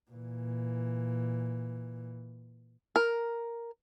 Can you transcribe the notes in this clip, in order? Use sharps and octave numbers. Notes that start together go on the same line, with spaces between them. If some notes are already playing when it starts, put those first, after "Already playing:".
A#2 E3
A#4